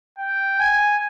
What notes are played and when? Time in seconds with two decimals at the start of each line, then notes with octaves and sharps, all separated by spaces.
0.19 G5
0.60 G#5